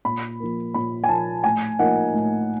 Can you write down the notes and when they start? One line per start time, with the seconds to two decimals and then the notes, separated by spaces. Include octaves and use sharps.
0.05 A#2 B5
0.40 F3 A#3
0.74 A#2 B5
1.04 G#5
1.09 F3 A#3 A5
1.44 A2 G#5
1.79 F3 A#3 D#4 F#5
2.14 A2